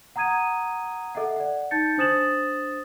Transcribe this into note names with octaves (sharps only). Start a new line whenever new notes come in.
F#5 A#5 D#6 G#6 D#7
A4 D#5 E5 F#5
D5 F#5
D#4 A5 G6 A6 C#7
D4 C5 D#6 A6 E7 F#7